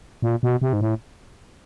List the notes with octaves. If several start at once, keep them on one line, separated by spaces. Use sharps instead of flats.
A#2
B2
C3
G#2
A2